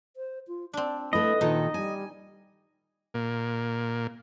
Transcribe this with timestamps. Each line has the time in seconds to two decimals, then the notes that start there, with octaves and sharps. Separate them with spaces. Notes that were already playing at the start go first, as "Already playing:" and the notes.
0.16 C5
0.48 F4
0.73 C4 D4 D5
1.13 A3 E4 B4 D#5
1.41 A#2 D#3 D#4 A4
1.74 G3 G#5
3.14 A#2